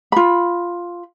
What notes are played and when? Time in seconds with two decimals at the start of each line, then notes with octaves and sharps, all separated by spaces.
0.12 F4 B5